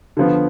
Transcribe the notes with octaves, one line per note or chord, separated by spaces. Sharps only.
D3 F3 B3